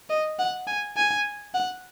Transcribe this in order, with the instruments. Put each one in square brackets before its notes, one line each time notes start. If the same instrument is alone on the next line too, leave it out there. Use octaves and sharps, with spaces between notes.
[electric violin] D#5
F#5
G#5
G#5
F#5